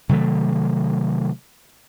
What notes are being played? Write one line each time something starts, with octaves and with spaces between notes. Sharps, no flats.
C3 D#3 F#3 A3